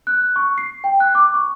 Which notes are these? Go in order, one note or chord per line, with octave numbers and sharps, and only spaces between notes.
F#6
C#6
C7
G5
F#6
D6
C#6